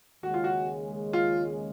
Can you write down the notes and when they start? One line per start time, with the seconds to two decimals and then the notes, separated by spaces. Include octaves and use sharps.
0.23 D#2 C#3 G#3 C#4 F#4
0.34 F4
0.44 F#4
1.13 F4